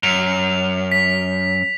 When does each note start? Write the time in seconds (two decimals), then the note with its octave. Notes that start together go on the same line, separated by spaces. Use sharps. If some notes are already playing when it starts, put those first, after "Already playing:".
0.03 F#2 F7
0.92 B6